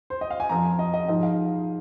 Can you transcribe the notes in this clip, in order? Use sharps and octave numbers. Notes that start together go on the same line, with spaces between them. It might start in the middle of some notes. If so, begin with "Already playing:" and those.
C5
D#5
F5
G#5
F2 F3 A#5
D#5
D#5
G#2 F3 D#5
F5